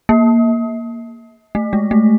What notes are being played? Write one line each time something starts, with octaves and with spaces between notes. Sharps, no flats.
A#3
A3
G#3
A3